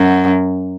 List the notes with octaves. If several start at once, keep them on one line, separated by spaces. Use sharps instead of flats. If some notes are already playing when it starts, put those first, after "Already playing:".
Already playing: F#2